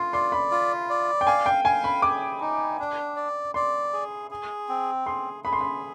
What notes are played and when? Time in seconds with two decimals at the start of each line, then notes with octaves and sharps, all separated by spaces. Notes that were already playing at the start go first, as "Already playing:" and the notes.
Already playing: F4 C6
0.13 D5 C6
0.32 B5
0.51 F4
0.90 D5
1.21 G5
1.27 F5 G#5
1.46 G5
1.65 F5 G#5
1.84 B5
2.02 G#4 D6
2.40 D#4
2.79 D4
3.16 D5
3.54 D5 C6
3.93 G#4
4.31 G#4
4.69 C4
5.06 G#4 C6
5.44 G#4 B5
5.53 C6
5.61 B5